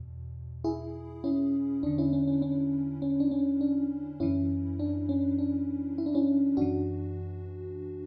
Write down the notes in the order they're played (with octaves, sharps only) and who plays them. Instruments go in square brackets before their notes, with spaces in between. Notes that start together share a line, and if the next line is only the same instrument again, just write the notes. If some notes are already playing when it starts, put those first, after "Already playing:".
Already playing: [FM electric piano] E2 B2
E4 G#4
C#4 E4
E2 D3 D4
C#4 E4
C#4
C#4
C#4
C#4
D4
C#4
D4
F#2 E3 C#4 E4
D4
C#4
D4
E4
D4
C#4 E4
F#2 E3 D4 F#4